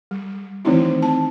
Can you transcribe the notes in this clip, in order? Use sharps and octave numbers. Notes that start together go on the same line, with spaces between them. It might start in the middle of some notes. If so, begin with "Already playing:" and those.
G3
D#3 E3 A3 C4 D#4 E4
C4 A5